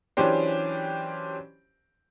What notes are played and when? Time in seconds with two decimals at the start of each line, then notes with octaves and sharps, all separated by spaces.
0.17 E3 F#3 C#4 D4 G4 C5